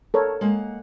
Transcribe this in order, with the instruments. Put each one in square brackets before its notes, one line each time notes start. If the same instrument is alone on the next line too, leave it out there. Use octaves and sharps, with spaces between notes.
[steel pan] A4 A#4 C#5
[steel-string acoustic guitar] G#3 A#3 F#5